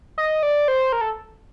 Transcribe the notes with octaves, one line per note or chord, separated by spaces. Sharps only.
D#5
D5
C5
A#4
A4